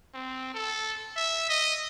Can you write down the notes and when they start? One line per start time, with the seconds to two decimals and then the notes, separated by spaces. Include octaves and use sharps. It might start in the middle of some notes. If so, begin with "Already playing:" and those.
0.14 C4
0.54 A4
1.16 E5
1.49 D#5